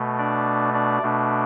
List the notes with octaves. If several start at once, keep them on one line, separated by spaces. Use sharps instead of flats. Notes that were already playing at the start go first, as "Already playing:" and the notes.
Already playing: B2 A3
D4 D5
D4 D5
B2 A3 D4